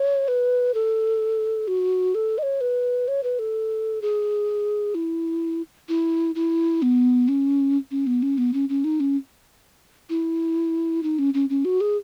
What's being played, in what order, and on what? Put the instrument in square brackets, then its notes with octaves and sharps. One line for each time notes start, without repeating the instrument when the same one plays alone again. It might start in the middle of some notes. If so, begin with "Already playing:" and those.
Already playing: [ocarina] C#5
B4
A4
F#4
A4
D#5
C#5
B4
C#5
B4
A4
G#4
E4
E4
E4
B3
C#4
C#4
B3
C#4
B3
C#4
C#4
D#4
C#4
E4
D#4
C#4
C#4
C#4
F#4
G#4